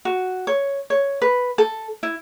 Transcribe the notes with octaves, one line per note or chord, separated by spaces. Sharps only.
F#4
C#5
C#5
B4
A4
E4